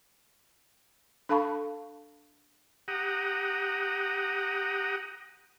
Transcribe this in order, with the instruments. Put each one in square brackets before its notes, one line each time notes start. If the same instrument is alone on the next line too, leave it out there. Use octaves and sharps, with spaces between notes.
[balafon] D4 A4 F5 A5 B5 C#6
[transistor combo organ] G4 F#5 A#5 D#6